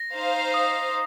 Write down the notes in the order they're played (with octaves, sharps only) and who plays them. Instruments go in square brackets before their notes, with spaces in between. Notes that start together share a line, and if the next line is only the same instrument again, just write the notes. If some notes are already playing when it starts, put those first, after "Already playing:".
Already playing: [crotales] A#6
[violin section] D#4 C5 F5
[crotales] D#6